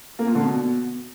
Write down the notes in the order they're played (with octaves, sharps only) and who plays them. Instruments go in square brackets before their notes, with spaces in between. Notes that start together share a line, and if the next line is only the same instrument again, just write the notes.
[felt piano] A#3
A#2
D3
B2